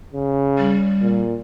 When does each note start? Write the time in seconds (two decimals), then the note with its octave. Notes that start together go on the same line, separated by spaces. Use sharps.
0.13 C#3
0.58 G3
1.02 A#2